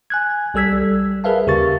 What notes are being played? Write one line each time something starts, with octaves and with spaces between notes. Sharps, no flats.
G#5 F#6 G#6
B1 G3 A4 E6 G#6 B6
G3
G#4 A#4 B4 E5 F5 A5
D#2 C#3 G4 A#4 C#6 A6